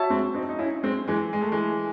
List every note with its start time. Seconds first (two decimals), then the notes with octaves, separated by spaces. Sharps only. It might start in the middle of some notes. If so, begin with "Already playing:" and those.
Already playing: F#4 C#5 E5 A5
0.10 G#3 C4
0.34 C4 D#4
0.49 D#4
0.59 C#4 E4
0.83 G#3 C4
1.08 E3 G#3
1.33 G#3
1.41 A3
1.52 E3 G#3